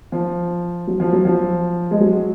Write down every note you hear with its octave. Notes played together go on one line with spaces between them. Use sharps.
F3
F#3
F3
F#3
F3
G#3
F#3